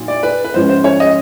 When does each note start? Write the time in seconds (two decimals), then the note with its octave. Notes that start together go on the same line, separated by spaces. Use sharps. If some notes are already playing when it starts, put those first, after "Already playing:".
Already playing: A#2 F#3 A#3 D#4
0.08 D5
0.23 B4
0.44 B4
0.54 G#2 F3 G#3 C#4 C5
0.69 C5
0.84 C#5
1.00 D#5